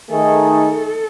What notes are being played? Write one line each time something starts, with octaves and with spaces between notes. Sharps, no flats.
D#3 A3 D#4 G#4 A4
A4